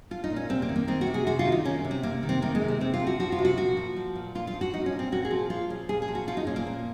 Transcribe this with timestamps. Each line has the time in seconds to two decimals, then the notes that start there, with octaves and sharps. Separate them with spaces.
0.11 F3 F4
0.24 D#4
0.30 A#2
0.36 C#4
0.49 C3 C4
0.62 A#3
0.69 D#3
0.76 A#3
0.88 D#3 C4
1.01 F#4
1.07 C3
1.14 G#4
1.26 C3 F#4
1.39 F4
1.46 D#3
1.52 D#4
1.65 D#3 C#4
1.85 C3
1.91 C4
2.03 C3 A#3
2.23 D#3
2.29 C4
2.42 D#3 A#3
2.55 G#3
2.61 C3
2.68 C4
2.80 C3 C4
2.93 F4
3.00 F3
3.07 F#4
3.20 F3 F#4
3.32 F4
3.39 C3
3.45 F#4
3.57 A#2 F#4
3.77 F3
3.96 F3
4.15 A#2
4.35 A#2 F4
4.47 F4
4.53 F3
4.61 F#4
4.73 F3 D#4
4.86 C#4
4.92 A#2
4.99 C4
5.12 A#2 F#4
5.25 G#4
5.31 F3
5.50 F3 F4
5.70 A#2 C#4
5.89 A#2 G#4
6.02 G#4
6.08 F3
6.15 F#4
6.28 F3 F4
6.37 D#4
6.47 A#2 C#4
6.56 A#3
6.67 A#2